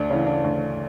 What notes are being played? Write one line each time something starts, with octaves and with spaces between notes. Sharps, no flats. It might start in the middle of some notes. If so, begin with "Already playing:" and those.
Already playing: D2 D4
C#3 E3 C#4
D4
D2